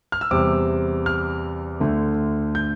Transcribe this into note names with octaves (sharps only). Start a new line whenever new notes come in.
F6
E6
E2 C3 G3 D6
F6
D2 D3 A3
G6